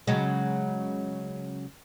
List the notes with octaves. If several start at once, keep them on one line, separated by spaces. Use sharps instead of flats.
C#3 F#3 G#3